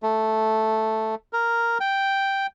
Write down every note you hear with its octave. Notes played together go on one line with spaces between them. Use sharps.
A3
A#4
G5